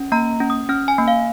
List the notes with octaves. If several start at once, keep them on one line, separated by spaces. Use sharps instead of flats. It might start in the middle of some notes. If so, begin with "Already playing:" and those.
Already playing: C#4
A#3 A#5
C#4
D#6
C#4 F6
G#5
A#3
F5